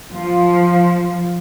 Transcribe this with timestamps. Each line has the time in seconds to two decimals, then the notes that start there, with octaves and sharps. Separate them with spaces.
0.14 F3